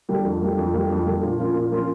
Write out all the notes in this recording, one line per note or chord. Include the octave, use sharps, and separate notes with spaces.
D3 G3 A#3
F2
D3 G3 A#3
F2
D3 G3 A#3
F2
D3 G3 A#3
A#2
F3 A#3 C#4 F4
A#2
F3 A#3 C#4 F4